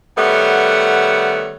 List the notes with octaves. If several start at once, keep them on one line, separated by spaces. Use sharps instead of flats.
D#3 G3 A3 B3 C#5 F#5